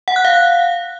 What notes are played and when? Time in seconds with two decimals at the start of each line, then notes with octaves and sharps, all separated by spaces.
0.08 F#5
0.16 F#6
0.25 F5